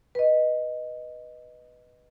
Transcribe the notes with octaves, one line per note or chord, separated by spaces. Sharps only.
B4 D#5